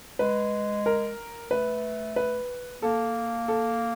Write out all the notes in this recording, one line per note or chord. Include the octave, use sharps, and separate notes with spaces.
G#3 B4
A#4
A3 B4
B4
A#3 A4
A4